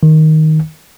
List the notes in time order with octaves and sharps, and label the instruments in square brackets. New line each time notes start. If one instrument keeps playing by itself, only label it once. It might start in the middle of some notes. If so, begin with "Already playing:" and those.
[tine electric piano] D#3